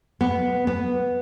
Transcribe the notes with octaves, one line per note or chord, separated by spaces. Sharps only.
B3
B3